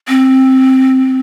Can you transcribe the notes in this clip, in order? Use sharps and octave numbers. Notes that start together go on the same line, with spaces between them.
C4